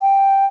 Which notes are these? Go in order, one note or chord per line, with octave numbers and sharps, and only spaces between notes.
G5